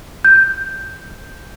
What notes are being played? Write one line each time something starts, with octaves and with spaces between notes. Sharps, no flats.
G6